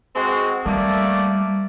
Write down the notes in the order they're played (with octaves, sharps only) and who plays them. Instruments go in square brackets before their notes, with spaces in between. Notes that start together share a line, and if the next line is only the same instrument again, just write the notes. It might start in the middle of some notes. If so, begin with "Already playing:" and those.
[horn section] G#3 C4 F#4
[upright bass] G3 [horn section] A3 A#3 D5